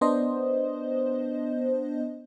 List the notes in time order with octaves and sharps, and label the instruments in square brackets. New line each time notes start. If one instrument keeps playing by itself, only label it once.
[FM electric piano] B3 D4 C5 D#5